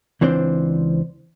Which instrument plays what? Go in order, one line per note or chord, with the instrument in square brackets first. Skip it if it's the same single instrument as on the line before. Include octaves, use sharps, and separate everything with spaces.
[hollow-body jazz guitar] C#2 E3 C4 D4 C5